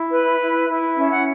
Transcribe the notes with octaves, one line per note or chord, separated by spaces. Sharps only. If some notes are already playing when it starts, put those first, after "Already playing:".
Already playing: E4
B4
E4
E4
C#4 E5
F#5